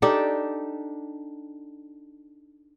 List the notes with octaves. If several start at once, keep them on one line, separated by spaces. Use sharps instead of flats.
D4 D#4 G4 A4